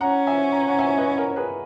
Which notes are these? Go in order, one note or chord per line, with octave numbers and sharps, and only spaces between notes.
C#4 F#5 A#5
E5 G#5
A#5
F#5 A#5
E5 G#5
B4 D#5
A#4 C#5
G#4 B4